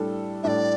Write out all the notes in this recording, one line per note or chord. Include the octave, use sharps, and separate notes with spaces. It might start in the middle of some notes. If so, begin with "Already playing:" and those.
Already playing: A2 G3 D4 A4
A2 G3 D4 A4 D5 E5